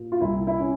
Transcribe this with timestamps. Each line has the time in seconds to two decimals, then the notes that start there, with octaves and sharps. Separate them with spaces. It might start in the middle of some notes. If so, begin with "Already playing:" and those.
Already playing: A#2
0.12 F4
0.20 C2 E4
0.47 E4
0.60 C#4